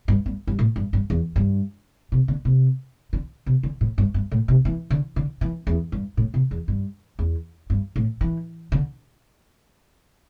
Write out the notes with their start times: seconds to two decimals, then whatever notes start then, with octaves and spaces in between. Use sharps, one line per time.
0.08 G2
0.26 G2
0.47 G2
0.59 A2
0.76 G2
0.93 G2
1.10 E2
1.36 G2
2.12 C3
2.28 D3
2.45 C3
3.13 D3
3.46 C3
3.63 D3
3.81 A2
3.98 G2
4.14 G2
4.32 A2
4.48 C3
4.65 E3
4.91 D3
5.16 D3
5.41 E3
5.67 E2
5.92 G2
6.17 A2
6.34 C3
6.51 E2
6.68 G2
7.19 E2
7.70 G2
7.96 A2
8.21 E3
8.72 D3